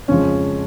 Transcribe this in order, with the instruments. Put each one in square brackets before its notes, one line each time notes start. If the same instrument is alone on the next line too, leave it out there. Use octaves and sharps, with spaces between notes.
[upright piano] F2 C#3 F3 G#3 C#4